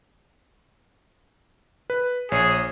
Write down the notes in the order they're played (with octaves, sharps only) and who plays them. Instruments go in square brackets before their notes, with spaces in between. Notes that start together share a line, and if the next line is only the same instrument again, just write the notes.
[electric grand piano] B4
[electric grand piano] A#1 C#5 [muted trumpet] G#4